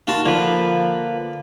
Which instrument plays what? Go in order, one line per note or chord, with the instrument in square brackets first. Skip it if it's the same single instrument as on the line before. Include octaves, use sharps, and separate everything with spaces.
[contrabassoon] D#2 [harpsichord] F4 F#4 A5
[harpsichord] D3 [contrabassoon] F3 [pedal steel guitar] A#3 B4